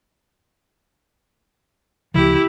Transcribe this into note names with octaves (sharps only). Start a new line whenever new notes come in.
D2 C#3 F3 E4 G4